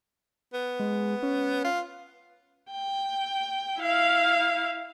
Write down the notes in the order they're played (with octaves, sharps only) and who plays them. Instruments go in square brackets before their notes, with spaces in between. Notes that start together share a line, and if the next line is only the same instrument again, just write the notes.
[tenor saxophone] B3
[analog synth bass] G#3
C#4
[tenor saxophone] F4
[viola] G5
E4 F5